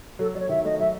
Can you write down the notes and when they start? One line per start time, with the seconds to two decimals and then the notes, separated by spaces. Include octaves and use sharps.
0.19 F#3 A4
0.35 F#3 D5
0.40 C#5
0.49 D#3 E5
0.65 A3 D#5
0.79 F#3 E5